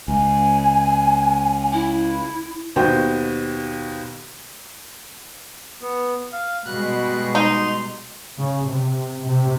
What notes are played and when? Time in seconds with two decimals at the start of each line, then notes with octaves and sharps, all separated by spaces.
0.08 C#2 G#5
1.73 E4
2.76 D#2 B2 F#4 C5 G5
5.81 B3
6.32 F5
6.66 B2 G3 G#3 F#6
7.35 D#4 C6
8.39 C#3
8.69 C3
9.25 C3